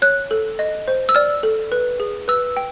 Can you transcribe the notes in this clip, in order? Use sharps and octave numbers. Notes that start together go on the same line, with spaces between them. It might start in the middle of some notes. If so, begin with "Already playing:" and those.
C#5 F#6
A4
D#5
C5
E6
D5 F6
A4
B4
G#4
B4 E6
G5